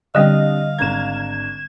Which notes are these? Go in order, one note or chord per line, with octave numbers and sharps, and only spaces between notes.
D3 G3 C4 D4 G4 D#5 F5
G#1 D4 A#5 G#6 E7